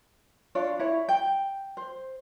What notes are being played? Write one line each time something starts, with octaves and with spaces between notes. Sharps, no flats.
D4 F4 C#5 D5
E4 C#5
G5
C5